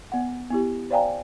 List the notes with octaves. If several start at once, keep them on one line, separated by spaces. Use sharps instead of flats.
B3 F#5
B3 E4 G4
C5 D5 F5 G5 G#5 A#5